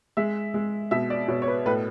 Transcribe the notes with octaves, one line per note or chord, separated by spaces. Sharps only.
G#3 E5
G#3
B2 E5
D5
B2 C#5
C#5
B4
A2 B4